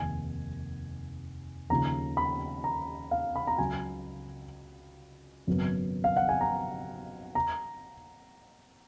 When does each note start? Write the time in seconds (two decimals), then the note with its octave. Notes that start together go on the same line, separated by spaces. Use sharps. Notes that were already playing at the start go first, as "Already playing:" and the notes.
Already playing: F1 D#2 D#3 G#5
1.70 D#2 C#3 F3 A#5
2.17 B5
2.64 A#5
3.11 F5
3.36 B5
3.47 A#5
3.58 C#2 C#3 F#3 G#5
5.47 G#1 F#2 C#3 F#3 B3
6.04 F5
6.17 F#5
6.29 G#5
6.41 A#5
7.35 A#5